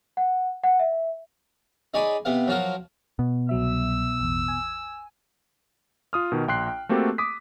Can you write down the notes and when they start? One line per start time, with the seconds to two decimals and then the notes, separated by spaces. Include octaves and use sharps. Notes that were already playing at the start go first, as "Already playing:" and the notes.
0.17 F#5
0.63 F#5
0.79 E5
1.94 D#4 G#4 C#5 D5 G#5 B5
2.25 C3 B3 F5
2.48 F3 F#3 F4 F#4 A#4
3.19 B2
3.49 C2 F#3 E5 E6
4.20 A1 E2
4.48 G#5
6.13 F4 D#6 F6
6.32 B2 D#3
6.48 A#1 G5 C6 F#6 C7
6.68 G5
6.89 A3 A#3 C4 F#4 G4 A4
7.18 D6 D#6 B6